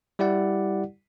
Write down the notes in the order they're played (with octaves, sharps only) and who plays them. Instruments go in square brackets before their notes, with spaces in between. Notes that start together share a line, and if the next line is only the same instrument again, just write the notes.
[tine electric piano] G3 E4 G4 D5 F#5